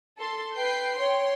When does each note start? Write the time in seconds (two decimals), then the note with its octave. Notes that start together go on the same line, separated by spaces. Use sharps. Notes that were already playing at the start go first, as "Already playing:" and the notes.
0.18 A4 C6
0.54 B4 G5 G6 C7
0.96 C#5 G5 C6